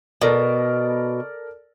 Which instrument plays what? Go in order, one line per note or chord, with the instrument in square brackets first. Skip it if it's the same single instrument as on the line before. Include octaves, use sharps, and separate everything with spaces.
[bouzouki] B2 [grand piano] A4 A#4 D5